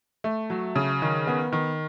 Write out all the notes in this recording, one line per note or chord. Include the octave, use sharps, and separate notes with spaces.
A3
F#3
C#3
D#3
B3
D#3